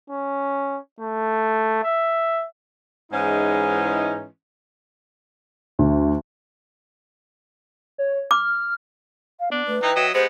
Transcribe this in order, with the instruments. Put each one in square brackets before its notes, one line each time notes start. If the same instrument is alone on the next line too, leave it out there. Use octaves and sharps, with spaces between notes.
[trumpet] C#4
A3
E5
[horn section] G#2 E3 G#3 C#4 D#4 E4
[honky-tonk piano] D2
[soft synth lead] C#5
[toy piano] D6 [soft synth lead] F6
[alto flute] F5
[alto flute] B3 [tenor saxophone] D4
[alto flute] A3 [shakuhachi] B4
[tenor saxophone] E3 [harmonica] D#4 [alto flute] G5
[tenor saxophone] F#3 [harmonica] D#5 E5
[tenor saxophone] G#3 [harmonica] B3 [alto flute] G4 [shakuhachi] C5